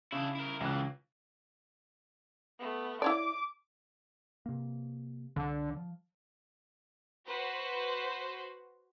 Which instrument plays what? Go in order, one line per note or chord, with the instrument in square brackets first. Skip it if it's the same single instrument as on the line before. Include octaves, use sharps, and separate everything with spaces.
[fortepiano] C#3 [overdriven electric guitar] D4 E4
[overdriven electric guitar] E4 A#4
[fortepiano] C#2 F#6 [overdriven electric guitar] C#3 E3
[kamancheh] A3 B3
[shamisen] E4 C#5 D5 [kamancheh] D6
[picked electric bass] C3 A#3
[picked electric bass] C2 [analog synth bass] D3
[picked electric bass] F3
[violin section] F#4 B4 C5